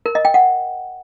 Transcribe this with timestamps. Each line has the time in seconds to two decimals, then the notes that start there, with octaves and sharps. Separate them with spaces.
0.06 A#4
0.15 D#5
0.25 G5
0.34 F#5